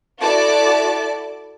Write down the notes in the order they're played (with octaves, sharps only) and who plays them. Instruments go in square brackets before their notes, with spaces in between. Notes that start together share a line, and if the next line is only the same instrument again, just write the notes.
[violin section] E4 F#4 A4 D5 A5 D6